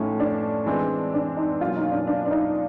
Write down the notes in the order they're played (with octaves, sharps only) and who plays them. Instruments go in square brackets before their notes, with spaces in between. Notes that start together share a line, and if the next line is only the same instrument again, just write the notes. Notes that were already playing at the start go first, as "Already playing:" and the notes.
Already playing: [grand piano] A2 F3 A3 C#4 E4 [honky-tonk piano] D#4
[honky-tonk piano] D4
[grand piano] E3 G#3 C4
[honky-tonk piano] D4
D#4
[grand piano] B2 F#3 A#3 C#4 [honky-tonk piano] F4
[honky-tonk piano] D#4
D4
D4
D4
D#4